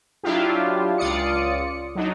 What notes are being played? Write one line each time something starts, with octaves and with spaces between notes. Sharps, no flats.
F#3 D4 E4 F4 G4
C#2 F4 D5 D#6 C#7
F#3 D4 D#4